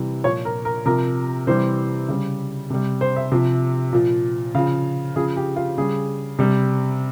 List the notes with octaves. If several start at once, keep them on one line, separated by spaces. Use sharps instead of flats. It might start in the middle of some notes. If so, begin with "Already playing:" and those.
Already playing: C3 E3 G3
A#2 F3 C#5
A#4
A#4
C3 F3 A#4
C3 E3 G3 C5
C#3 G3
C3 G3
C5
E5
C3 F3
A#2 F3
C#3 F3 F5
C#3 F3 G#4
G4
F4
C#3 G3 G#4
C3 G3